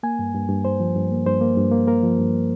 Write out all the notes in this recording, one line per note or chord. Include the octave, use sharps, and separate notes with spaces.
A#3 G#5
G2
G2
G2
G2 C5
F3
G2
A#3
G2 C5
A#3
G2
A#3
A#3 A#4
F3
G2